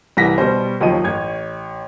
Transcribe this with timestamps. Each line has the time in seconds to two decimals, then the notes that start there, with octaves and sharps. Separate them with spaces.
0.17 C2 E3 F#5 A#6 B6
0.38 B2 G3 C5
0.81 D#2 F3 F#3 D#5 D#7
1.04 A1 C#5 G#6